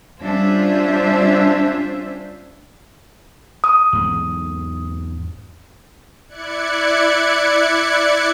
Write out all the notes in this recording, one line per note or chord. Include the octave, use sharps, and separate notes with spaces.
G3 C#4 D4 F4 C5 E5
D#6
E2 G#2 G#3
E4 D5 F#6 G#6 C#7